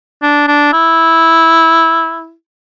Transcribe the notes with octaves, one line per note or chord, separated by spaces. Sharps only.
D4
D4
E4